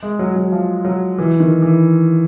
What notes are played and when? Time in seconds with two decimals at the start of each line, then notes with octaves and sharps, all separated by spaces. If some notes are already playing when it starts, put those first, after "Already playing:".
0.03 G#3
0.19 F#3
0.36 F#3
0.52 F3
0.85 F#3
1.18 E3
1.40 D#3
1.62 E3